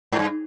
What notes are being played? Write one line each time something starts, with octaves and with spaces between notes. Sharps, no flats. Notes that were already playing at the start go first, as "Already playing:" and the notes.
G#2
G2